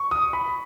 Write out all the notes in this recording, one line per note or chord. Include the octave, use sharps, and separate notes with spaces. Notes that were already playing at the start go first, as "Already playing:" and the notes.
Already playing: C#6
D#6
B5